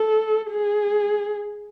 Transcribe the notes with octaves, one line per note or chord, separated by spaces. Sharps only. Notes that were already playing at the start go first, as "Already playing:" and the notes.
Already playing: A4
G#4